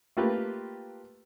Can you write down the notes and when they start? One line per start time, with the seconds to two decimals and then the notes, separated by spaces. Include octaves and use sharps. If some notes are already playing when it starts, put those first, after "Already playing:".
0.17 A3 A#3 F4 G4 B4